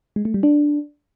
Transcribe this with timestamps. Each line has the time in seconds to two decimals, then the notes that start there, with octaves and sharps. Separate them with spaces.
0.16 G#3
0.25 A3
0.34 G3
0.43 D4